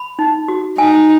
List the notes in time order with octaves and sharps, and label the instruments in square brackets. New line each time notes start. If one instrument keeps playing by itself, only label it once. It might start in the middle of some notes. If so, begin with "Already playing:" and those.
Already playing: [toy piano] B5
D#4
F#4
[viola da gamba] D#4 [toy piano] G#5